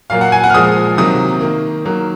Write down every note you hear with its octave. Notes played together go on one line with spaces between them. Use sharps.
A#2 F#3 A#3 F5
F#5
G#5
F#5
F6
A#2 F3 G#3 D#6
C3 D#3 F#3 A#3 D#6
D#3 A#3
D#3 F#3 A#3